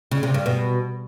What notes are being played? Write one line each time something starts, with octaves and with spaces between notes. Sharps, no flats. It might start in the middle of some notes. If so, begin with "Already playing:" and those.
C#3
C3
G2
B2